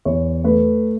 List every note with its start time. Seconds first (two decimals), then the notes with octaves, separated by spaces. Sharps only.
0.05 E2 C#5
0.44 A3 B4